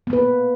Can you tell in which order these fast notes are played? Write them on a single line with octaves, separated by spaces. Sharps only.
B3 A#3 B4